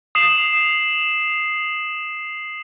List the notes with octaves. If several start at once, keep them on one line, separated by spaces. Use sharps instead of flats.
D#6 C7 E7 F#7